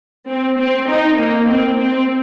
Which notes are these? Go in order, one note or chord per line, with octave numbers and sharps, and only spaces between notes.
C4
C4
D#4
A#3
C4
C4